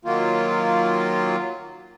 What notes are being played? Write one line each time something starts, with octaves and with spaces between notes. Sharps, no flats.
D#3 F#3 A#3 F4